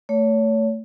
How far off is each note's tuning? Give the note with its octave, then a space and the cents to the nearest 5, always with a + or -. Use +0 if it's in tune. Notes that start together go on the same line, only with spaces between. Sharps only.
A3 +15 C#5 +30